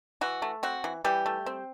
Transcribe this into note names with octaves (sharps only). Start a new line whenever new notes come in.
E3 F#4
A3
C4 F#4
E3
E3 G3 G4
A3
C4